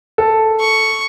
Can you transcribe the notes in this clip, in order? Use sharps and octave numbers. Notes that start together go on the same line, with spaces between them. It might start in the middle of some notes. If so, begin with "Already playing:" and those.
A4
C#6